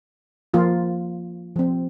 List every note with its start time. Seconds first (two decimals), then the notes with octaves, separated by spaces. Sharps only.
0.54 F3 A#3 F4
1.56 F3 C4